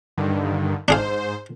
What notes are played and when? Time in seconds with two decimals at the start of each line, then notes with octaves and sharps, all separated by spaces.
0.17 G2 D3 D#3
0.88 G#2 D4 G#4 C5 F5